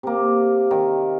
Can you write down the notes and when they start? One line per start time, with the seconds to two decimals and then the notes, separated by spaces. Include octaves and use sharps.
0.03 C3 A#3
0.71 D#3